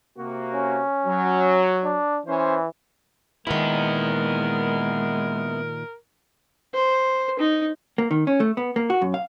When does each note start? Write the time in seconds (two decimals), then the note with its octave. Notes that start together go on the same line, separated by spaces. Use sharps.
0.18 C3 A#3 F#4
0.55 C#4
1.06 F#3
1.84 D4
2.26 E3 C#4 B4 C5
3.47 A#2 D#3 G#3 B3 E4 A#4
6.74 C5
7.39 D#4
7.98 A#3
8.11 D#3
8.27 C#4
8.40 A3
8.57 B3
8.76 A#3
8.90 F#4
9.02 F#2
9.14 F5